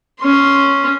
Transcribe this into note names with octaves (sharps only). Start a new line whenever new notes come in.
C#4 C6